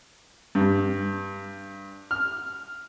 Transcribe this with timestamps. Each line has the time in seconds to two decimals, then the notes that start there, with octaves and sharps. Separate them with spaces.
0.55 G2
2.11 F6